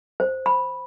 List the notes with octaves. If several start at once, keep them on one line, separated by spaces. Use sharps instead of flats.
C5
B5